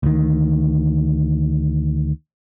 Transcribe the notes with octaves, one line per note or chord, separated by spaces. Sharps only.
D2 D#3